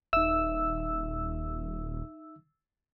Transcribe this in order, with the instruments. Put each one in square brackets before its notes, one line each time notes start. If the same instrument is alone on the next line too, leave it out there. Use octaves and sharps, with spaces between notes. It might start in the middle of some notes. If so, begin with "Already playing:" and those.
[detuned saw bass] D#1 [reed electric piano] D#4 E5 [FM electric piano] E6